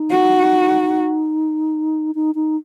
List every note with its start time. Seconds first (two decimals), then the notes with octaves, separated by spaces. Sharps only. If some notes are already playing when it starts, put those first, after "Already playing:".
Already playing: D#4
0.11 F#4
2.15 D#4
2.35 D#4